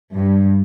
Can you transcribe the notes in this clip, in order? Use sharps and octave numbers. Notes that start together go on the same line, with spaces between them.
G2